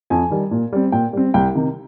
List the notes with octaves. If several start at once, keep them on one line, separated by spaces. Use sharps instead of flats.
F2 G#5
D#3 G3
A#2
G3 C4
A#2 G5
G3 C4
C2 G5
C3 D#3